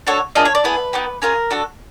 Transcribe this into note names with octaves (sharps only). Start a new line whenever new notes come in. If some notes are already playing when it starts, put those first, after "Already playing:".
D4 F#4 A4 C#5
A#3 D4 F4 G#4 D#5
C#5
D5
B3 E4 G#4 B4
B3 D#4 G4
C#4 F4 G#4 A#4
D4 F#4 A4